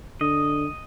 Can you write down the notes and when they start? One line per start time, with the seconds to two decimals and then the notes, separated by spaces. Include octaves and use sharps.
0.21 D3 D#5